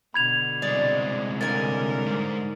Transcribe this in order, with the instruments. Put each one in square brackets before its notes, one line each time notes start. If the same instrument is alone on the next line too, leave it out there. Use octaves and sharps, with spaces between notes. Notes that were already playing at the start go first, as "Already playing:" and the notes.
[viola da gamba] B2 D3 [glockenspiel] B5 G#6 F7
[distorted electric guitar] C2 G#3 [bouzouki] D5
[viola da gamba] D3 C#4 A#4 [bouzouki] A#3 F#5 G#5 [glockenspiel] A6
[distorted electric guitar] G#2